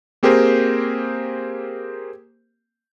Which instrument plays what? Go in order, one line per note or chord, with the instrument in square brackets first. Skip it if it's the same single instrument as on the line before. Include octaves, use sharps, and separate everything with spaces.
[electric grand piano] A#3 C4 G4 G#4 A#4 C5